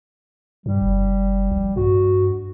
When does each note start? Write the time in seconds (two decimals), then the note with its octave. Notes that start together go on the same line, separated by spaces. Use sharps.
0.66 G2 G3
0.81 F#1
1.51 A#1
1.76 G2 F#4